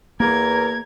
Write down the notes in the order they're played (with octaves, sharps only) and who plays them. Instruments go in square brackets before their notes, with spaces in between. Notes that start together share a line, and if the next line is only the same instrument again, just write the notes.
[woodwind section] E2 [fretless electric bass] A#3 [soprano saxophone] A#4 [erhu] G#6